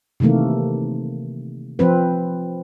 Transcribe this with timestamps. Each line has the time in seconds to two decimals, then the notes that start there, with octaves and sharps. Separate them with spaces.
0.20 C3 D#3 E3 A3 A#3
1.79 F3 C4 B4